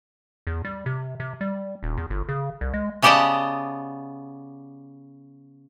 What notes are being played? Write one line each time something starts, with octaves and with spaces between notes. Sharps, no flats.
E2
G3
C3
C3
G3
D#1
E2
G1
C#3
C2
G#3
C#3 B3 G4 D5 D#5 A5